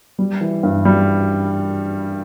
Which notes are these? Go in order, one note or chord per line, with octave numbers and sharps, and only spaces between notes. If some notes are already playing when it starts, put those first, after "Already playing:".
G3
E3
G2
G3